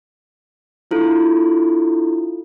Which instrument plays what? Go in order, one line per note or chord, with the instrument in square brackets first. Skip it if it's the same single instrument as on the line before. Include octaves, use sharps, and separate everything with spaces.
[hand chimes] D4 E4 F4 A4